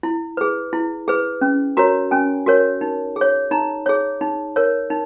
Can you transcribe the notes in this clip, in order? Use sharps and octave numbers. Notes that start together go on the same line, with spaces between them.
E4
G#4 B4
E4
G#4 B4
C#4
F#4 A#4 C#5 A#5
C#4 G#5
F#4 A#4 C#5
D#4
G#4
C#5
D#4 A#5
G#4 C#5
D#4
A#4 C#5
D#4